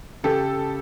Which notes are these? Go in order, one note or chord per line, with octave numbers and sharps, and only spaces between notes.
C#3 G4 A4